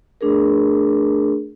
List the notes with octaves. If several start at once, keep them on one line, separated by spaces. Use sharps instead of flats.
A3 D4 G#4 A#4